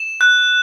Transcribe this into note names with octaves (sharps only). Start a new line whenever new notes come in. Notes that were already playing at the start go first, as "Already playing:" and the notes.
Already playing: E7
F#6